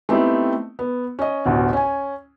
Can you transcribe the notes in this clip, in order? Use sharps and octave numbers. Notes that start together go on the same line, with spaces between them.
A3 B3 C4 D#4 E4 G4
B3
C#4 D#5
A1 D2 B2
C#4 G#5